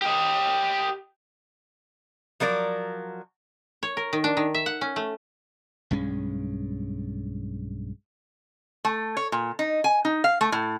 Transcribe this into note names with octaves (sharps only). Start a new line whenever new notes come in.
G4 D#5
F3 F#3 A#4 D5
C#5
A#4
D#3
D4
D#3
E5
F#5
C#4
A3
B1 G2 G#3 C#4
A3
C#5
A#2
D#4
G#5
D#4
F5
A3
A2